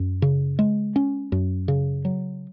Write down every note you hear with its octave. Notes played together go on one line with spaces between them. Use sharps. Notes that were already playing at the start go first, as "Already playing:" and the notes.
Already playing: F#2
C#3
G#3
C#4
F#2
C#3
F#3